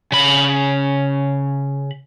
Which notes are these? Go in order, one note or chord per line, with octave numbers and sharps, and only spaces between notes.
C#3 B5